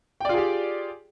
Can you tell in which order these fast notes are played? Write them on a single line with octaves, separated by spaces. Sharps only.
G5 D5 F4 G#4 G4